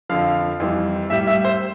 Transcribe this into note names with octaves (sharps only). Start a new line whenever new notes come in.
F2 D3 F3 F5
F2 E3 G3
A2 G3 E5
E5
C5